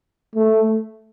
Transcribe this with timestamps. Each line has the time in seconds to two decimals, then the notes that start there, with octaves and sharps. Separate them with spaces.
0.35 A3